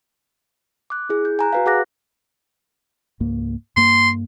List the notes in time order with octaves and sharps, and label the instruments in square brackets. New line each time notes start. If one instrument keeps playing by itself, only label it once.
[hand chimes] D6 F#6
E4 G#4
G6
G#5 A#5 F#6
F#4 B4 F5
F#4 G#4 F#5 D6 F#6 A#6
[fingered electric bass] C#2 G#2 A#3
[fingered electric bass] G2 A#3 [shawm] C6